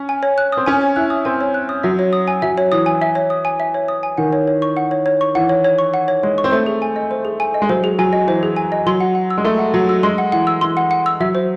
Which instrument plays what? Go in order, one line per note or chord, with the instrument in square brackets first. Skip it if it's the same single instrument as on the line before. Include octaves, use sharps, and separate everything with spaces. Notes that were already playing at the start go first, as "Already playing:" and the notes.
Already playing: [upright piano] C#4
[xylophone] G#5
C#5
F#6
[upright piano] C4 [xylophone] D#6
[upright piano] C#4 [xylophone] G#5
[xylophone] C#5
[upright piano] E4 [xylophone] F#6
[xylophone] D#6
[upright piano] C4 [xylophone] G#5
[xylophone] C#5
F#6
D#6
[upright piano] F#3 [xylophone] E5
[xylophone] C#5
D#6
G#5
[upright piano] F#3 [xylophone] E5
[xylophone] C#5
[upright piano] E3 [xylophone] D#6
[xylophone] G#5
E5
C#5
D#6
G#5
E5
C#5
D#6
G#5
[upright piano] D#3 [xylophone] F#5
[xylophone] C#5
C#5
C#6
F#5
C#5
C#5
C#6
[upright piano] E3 [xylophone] F#5
[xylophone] C#5
C#5
C#6
F#5
C#5
[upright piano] G#3 [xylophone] C#5
[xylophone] C#6
[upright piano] C4
[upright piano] A3 [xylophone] C5
[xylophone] G#4
G#5
D#5
C5
G#4
G#5
D#5
[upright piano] G#3
[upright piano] F#3 [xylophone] C5
[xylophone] G#4
[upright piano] F#3 [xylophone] G#5
[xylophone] D#5
[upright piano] E3 [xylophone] C5
[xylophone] G#4
G#5
D#5
[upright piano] F#3 [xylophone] C6
[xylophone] F#5
F#5
E6
[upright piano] G#3
[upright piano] A3 [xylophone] C6
[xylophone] F#5
[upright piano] F#3 [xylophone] F#5
[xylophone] E6
[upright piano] G#3 [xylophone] C6
[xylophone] F#5
[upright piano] E3 [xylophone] F#5
[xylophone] E6
[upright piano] E3 [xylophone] C6
[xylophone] F#5
F#5
E6
[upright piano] F#3 [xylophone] E5
[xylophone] C5